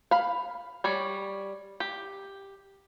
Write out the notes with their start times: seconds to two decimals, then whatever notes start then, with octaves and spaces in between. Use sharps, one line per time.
0.11 F5 B5
0.84 G3 C#5 D5
1.80 G4